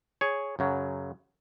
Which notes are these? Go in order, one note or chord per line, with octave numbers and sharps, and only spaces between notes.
G#4 C#5
F#2 C#3 F#3